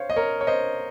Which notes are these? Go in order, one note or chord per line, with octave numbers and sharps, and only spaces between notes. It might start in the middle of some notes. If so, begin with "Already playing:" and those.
Already playing: C5 C#5 F5
D#5
A#4 C#5
C#5
C5 D#5